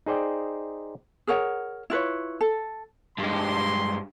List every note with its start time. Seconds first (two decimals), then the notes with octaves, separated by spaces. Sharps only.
0.06 D#4 G#4 C5 D5 G5
1.27 G#4 A#4 C#5 F#5
1.90 E4 F4 B4 C#5
2.41 A4
3.18 G2 G#3 C6